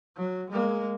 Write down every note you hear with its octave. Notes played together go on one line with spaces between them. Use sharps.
F#3
G#3 A#3